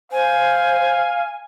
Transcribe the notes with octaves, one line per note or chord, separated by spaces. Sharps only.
C5 F5 G#5